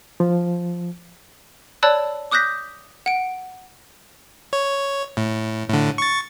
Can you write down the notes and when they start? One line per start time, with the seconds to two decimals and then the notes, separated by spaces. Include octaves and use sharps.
0.20 F3
1.83 C#5 D5 A5 B5 E6 F#6
2.31 D6 D#6 F#6 G6 A#6 B6
3.06 F#5 D7
4.53 C#5
5.17 A2
5.69 A2 D3
5.98 C#6 A6